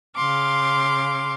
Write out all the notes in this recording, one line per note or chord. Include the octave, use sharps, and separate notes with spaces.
C#3 F5 C6 D6